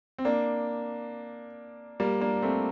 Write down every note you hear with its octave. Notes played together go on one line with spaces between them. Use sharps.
C4
A#3 D4
G3 A#3
A#3 D4
A3 C4